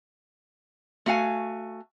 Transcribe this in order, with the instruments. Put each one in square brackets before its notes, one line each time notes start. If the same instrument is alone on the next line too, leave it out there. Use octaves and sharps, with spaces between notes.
[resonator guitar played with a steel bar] A3 F#4 F5 G#5